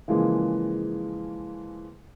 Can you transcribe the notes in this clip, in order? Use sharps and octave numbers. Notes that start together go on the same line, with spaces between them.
C#3 E3 F3 G#3 A#3